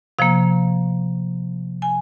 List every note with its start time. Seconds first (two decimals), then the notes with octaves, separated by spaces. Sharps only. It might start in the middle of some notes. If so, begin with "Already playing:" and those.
0.19 C3 F3 A#3 F5
1.82 G#5